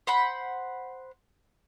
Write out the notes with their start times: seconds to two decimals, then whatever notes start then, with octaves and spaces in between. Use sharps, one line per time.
0.07 C5 F#5 B5